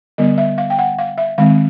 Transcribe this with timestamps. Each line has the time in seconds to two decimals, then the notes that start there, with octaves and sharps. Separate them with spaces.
0.18 D3 G3 B3 D#5
0.38 E5
0.58 F5
0.70 G5
0.79 F#5
0.98 F5
1.18 E5
1.38 D#3 G#3 C4 F5